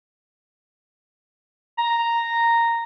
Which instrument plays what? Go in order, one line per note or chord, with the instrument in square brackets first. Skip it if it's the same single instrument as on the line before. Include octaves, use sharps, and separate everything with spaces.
[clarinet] A#5